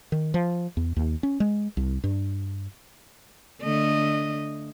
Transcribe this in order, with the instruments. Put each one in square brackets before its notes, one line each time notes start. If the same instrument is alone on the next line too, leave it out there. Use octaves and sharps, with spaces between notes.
[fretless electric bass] D#3
F3
E2
D#2
C#4
G#3
C2
G2
[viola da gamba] D3 A3 D#5